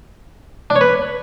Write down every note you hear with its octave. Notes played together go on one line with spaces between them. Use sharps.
D4
C#5
B4